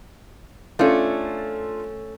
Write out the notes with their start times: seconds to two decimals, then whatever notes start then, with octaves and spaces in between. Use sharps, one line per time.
0.79 A3 C#4 D4 F4 A4